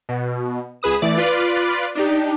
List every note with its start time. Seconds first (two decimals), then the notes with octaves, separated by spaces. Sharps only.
0.09 B2
0.82 C#2 G#4 B4 D#6 E7
1.02 E3 A3 D5
1.17 F4 B4 D5
1.95 D4 D#4 G4